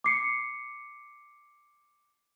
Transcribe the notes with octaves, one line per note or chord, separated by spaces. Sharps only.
D6 C7 C#7